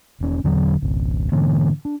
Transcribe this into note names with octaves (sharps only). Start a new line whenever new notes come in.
E1 C#4
E2 D3 E3 F#3
G#1 C#2
G#2 D3 E3 A#3
D4